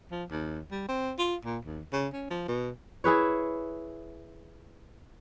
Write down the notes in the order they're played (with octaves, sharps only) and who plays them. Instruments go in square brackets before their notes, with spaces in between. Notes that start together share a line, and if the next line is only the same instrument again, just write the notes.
[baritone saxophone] F3
D#2
G3
C4
F4
A#2
D#2
C#3
C#4
F3
B2
[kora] E4 G#4 B4 C#5